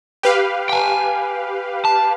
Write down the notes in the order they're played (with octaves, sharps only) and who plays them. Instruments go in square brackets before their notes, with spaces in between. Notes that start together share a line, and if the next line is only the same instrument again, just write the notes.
[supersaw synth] G4 B4 F5
[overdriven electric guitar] G5 G#5
A5